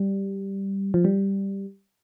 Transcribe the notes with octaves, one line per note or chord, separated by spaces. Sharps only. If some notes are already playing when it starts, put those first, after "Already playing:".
Already playing: G3
F3
G3